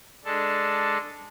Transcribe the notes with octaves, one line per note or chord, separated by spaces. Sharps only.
G#3 D4 A4